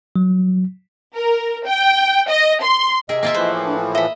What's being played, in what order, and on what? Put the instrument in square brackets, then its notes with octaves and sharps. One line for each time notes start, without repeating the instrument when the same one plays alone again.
[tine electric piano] F#3
[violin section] A#4
G5
D#5
C6
[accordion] C3 [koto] G#4 A#4 E5 [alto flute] D#5
[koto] A#3 F4 E5
[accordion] A2 E3 F3 [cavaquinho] B4 C5
[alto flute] D4
E4
[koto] D#5 [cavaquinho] E5 B5